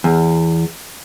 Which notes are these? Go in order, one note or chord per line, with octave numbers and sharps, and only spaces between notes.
E2